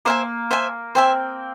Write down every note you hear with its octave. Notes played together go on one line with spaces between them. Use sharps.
A#3 C5 E5 G#5
C5 E5 G#5
C4 C5 E5 G#5